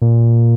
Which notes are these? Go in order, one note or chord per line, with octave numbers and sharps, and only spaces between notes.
A#2